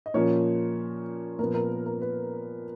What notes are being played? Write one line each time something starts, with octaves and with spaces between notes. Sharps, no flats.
D#5
A#2 F3 A#3 C#4 C#5
A#2 F3 B3 A#4
A#4
A#4
B4